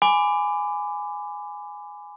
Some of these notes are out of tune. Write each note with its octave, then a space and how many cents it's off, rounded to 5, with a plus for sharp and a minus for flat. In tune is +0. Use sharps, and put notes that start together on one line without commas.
G#5 +0 B5 +30 D6 +0